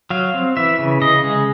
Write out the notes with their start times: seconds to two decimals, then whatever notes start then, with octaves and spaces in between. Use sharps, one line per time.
0.10 F#3 F5
0.34 C4
0.57 E3 E5
0.79 C#3
1.01 C#3 D#5
1.24 G#3